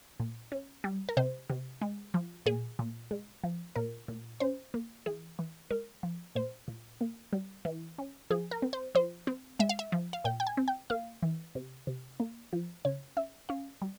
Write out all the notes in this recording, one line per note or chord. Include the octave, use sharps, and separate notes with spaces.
A#2
C#4
G3
A#4
C3 C5
C3
G#3
F3
A#2 G#4
A#2
G#3
F3
A#2 A#4
A#2
C#4 C5
A#3
E3 G#4
E3
G#3 A#4
F3
A#2 C5
A#2
A#3
G3
E3
C#4
F3 G#4
A#4
C4
C5
F3 C5
C4
G#3 E5
F5
E5
F3
F5
A#2 G5
G5
G#5
C4
G5
A#3 F5
E3
C3
C3
A#3
F3
C#3 C#5
C#4 E5
C#4 F5
G3